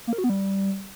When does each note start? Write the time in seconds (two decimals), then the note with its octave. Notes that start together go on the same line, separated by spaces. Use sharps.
0.07 A#3
0.13 A#4
0.18 F#4
0.24 B3
0.29 G3